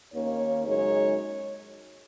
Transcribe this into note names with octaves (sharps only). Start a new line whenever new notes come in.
D#2 D#3 A#3 C#4 C#5
F#2 C#3 G#3 D#4 C#5